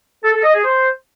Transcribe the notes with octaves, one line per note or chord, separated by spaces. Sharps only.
A4
A4
D#5
G#4
C5